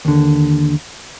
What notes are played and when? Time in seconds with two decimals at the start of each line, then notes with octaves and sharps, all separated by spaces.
0.05 D#2 D3